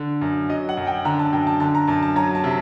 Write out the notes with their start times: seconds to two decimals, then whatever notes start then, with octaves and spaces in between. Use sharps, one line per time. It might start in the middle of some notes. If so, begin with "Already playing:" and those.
Already playing: D3
0.21 F#2
0.49 F#3 D#5
0.69 F#5
0.77 F#2
0.87 G5
1.05 D3 A#5
1.19 A5
1.33 F#2 G5
1.47 A5
1.60 D3 A5
1.75 A#5
1.88 F#2 A5
2.03 A5
2.16 F#3 A#5
2.35 A5
2.44 C3